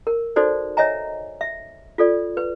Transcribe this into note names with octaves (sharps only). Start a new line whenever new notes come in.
A#4
D#4 F#4 A4 C5 D5
C#5 D#5 E5 G#5 A#5
E5
F4 A4 D5
B4